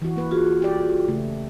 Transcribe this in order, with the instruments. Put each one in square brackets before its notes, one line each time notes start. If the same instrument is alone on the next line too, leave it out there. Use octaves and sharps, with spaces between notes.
[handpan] E3 F#4
A#3 B4
[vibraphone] F4 F#4 G#4
[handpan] G4 D5
C#3 A3